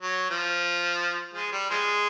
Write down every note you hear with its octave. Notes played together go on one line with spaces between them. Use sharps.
F#3
F3
F3 G#3
G3
F3 G#3